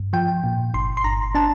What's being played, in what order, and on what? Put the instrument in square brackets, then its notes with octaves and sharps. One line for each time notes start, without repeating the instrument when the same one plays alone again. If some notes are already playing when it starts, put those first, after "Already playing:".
Already playing: [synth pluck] G2
F3 G5
A#2
G1 C6
C6
G1 A#5
D4 A5